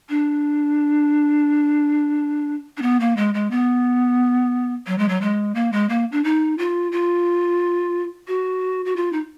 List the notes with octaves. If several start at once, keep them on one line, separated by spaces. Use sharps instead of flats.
D4
D4
B3
A#3
G#3
G#3
B3
F#3
G#3
F#3
G#3
A#3
G#3
A#3
D4
D#4
F4
F4
F#4
F#4
F4
D#4